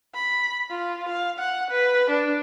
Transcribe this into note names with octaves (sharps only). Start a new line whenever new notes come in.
B5
F4
F5
F#5
B4
D4